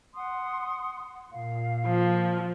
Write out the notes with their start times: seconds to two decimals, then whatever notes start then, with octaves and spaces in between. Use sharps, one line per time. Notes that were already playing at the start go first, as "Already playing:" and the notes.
0.15 F#5 C6 D#6
1.32 A#2 F5
1.86 F3